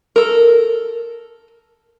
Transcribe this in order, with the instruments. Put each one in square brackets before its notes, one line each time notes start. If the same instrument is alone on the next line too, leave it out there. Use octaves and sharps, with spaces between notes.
[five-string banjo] A4 A#4